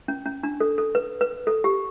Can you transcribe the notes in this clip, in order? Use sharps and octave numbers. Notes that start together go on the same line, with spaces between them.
C#4
C#4
D4
A4
A4
B4
B4
A4
G4